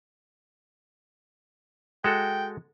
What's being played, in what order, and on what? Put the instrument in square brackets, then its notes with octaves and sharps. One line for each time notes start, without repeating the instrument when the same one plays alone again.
[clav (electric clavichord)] G#3 F#4 A4 [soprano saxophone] G5